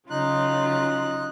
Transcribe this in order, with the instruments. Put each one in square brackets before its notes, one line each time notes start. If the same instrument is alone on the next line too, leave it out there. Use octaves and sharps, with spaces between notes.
[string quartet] C#3 F#3 F4 [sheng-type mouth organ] D#4 F#6